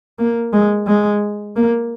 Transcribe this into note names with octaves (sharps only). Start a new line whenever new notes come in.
A#3
G#3
G#3
A#3